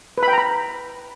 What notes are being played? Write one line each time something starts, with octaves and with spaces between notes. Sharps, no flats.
B4
B5
G5
A#5
B5